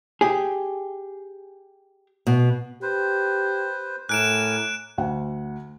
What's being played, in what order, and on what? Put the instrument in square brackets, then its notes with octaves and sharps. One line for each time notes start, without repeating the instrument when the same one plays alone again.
[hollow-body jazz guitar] G4 G#4
[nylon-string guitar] B2
[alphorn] G4 [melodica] B4 C5
[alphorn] A2 [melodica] A#4 G#5 D6 [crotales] F#6 D7 E7
[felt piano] D2 F#5